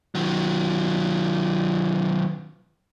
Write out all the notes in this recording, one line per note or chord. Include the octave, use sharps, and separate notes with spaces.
D#3 F#3